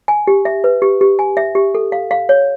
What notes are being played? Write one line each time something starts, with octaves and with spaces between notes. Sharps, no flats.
G#5
G4
E5
B4
G4
G4
G#5
E5
G4
A4
F5
F5
C#5